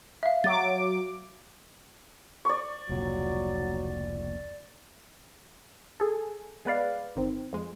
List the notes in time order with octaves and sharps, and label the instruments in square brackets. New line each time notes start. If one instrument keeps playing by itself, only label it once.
[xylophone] E5 F5
[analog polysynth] F#3 D6 [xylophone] A6
[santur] D5 C#6
[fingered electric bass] F1 C#2 A#2 [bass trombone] F#3
[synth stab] G#4 A4
G#3 B3 B4 D5 F5
G1 D#3 C4
F2 G#3